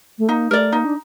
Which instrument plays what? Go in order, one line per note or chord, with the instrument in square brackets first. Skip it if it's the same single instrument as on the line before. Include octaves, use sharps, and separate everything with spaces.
[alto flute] A3
[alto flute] A#3 [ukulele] D#4
[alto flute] A3 [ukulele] A#4 D5
[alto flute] A#3 [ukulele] D#4
[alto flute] D4